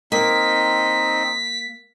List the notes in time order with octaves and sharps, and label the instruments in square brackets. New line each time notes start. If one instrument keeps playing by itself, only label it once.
[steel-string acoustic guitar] A#3 [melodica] C4 D#4 D#5 [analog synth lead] B6